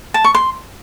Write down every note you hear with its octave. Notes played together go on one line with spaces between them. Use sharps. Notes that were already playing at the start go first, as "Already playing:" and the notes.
A5
C#6
C6